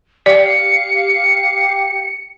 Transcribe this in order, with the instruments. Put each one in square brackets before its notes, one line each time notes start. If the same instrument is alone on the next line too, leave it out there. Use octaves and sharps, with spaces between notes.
[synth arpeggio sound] G4 [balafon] D5 [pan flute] F5 [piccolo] C#7